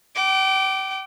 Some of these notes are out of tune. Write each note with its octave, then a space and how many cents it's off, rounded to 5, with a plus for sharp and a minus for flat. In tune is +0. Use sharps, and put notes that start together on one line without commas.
G5 -40 D6 +0